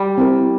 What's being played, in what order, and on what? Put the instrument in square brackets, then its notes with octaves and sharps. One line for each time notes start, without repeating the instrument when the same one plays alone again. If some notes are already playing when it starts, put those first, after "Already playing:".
Already playing: [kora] G3
[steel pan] C4 E4 A#4